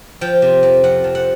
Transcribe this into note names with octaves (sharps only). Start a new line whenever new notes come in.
F3 G5
C3
F2
F2 F#5
F3
F#5